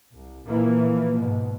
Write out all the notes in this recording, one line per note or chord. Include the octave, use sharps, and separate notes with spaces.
C2
A#2 E3 F3 A#3
G#2 B2